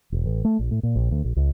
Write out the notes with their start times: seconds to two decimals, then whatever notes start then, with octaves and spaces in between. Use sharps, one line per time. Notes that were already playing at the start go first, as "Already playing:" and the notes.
0.12 E1
0.26 A1
0.45 A3
0.59 A#1
0.71 A2
0.83 A#2
0.96 A#1
1.11 D2
1.24 A#1
1.36 C#2